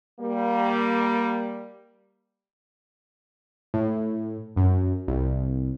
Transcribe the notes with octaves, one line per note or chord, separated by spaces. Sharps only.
G3 A#3
A2
F#2
C2